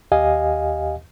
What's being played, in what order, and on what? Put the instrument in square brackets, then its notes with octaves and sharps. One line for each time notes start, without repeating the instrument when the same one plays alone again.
[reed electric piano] D#2 G4 D#5 F5 G#5